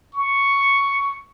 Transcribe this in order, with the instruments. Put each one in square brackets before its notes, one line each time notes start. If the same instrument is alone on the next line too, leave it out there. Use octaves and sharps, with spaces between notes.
[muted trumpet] C#6